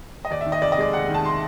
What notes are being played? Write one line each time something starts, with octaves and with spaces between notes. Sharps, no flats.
D#5
D#2 D5
E5
D#3
D#5
F1 D5
D#5
G#3 D5
D#2 F#5
D#3
A5
C6